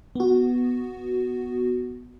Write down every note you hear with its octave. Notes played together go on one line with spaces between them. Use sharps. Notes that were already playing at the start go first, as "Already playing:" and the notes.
B3 F#4